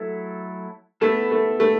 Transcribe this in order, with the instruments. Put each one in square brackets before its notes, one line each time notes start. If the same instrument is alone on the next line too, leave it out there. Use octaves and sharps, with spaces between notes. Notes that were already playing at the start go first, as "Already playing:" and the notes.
Already playing: [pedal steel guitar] F#3 A3 E4 A4
[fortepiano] A3 [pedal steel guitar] B3 E4 A4
[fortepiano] A3
A3